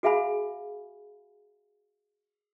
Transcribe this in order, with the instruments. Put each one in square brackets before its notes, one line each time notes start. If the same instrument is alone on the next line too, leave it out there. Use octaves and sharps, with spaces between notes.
[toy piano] F#4 G#4 E5 F5 G#5 B5